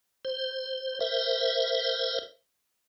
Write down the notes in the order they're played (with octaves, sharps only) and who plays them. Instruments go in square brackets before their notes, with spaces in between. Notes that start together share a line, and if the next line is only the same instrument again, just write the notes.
[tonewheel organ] C5
A#4 C5 E5